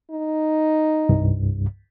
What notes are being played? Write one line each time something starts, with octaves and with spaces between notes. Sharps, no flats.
D#4
C2 G2